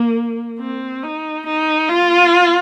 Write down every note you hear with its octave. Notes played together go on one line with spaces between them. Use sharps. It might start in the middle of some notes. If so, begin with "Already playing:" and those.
Already playing: A#3
C4
D#4
D#4
F4